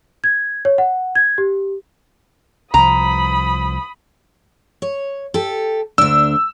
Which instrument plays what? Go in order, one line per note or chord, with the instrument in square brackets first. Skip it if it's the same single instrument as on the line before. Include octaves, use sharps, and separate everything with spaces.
[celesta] G#6
C#5
F#5
G#6
G4
[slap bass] C2 F3 [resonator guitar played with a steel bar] A#5 [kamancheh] B5 D#6
[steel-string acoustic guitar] C#5
G4 A4
[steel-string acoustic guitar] D2 D4 [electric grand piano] E6